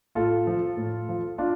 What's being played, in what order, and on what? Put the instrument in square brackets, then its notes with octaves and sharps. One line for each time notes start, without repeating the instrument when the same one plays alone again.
[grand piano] A2 F4 A4
F3
A2
F3
D4 F4